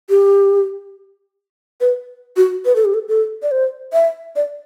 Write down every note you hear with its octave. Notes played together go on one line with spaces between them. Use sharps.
G4
B4
F#4
B4
A4
G4
A4
A4
D5
C5
E5
D5